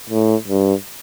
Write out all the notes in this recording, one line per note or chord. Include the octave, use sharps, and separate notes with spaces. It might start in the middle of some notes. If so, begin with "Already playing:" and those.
A2
G2